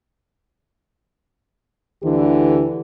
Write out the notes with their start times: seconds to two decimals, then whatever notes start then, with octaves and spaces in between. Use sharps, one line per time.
2.03 D2 D3 E3 G4